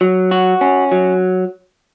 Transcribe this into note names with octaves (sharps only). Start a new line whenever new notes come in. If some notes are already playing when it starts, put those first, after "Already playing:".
F#3
F#4
C#4
F#3